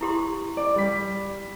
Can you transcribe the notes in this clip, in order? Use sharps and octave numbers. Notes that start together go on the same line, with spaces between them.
E4 G4 C6
D5
G3 B6